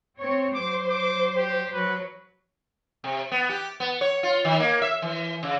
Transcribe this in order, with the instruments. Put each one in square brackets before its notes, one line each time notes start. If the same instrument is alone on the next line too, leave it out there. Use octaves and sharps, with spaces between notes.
[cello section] C4 C#5
[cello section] F#3 C5 [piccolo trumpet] D6
[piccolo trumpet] D6
G4
[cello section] F#3 [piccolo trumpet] B4
[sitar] C3
B3
G4
B3
C#5
F4
D#3
A#3
E5
E3
C#3